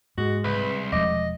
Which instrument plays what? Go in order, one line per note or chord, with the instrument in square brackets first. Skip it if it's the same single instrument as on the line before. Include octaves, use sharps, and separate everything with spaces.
[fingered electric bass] G#2 [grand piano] G#3 [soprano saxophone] F#4
[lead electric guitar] C2 [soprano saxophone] B4
[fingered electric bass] E1 F3 G#3 [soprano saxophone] D#5 [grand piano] D6